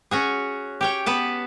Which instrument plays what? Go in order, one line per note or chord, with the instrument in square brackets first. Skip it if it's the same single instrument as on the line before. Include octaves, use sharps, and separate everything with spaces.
[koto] C#4 F#4 G#4
G4 C#5 G5
B3 B4 A5